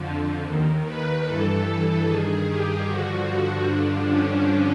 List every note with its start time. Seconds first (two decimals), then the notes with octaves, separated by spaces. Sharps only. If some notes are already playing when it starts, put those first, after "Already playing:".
Already playing: F2 D3 F3
0.45 D#2 D#3
0.85 B4
1.25 G2 E3 A4
2.05 G2 D#3 G#4
2.46 G4
2.86 G2 D3 F3 F#4
3.26 F#4
3.67 G2 D3 F3 D4
4.07 C#4